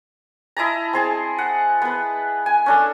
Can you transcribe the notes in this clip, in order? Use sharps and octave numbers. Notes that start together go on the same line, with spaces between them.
E4 D#5 A5 A#5
C4 G#4 A5
F#5
B3 B4
G#5
C#4 D4 A4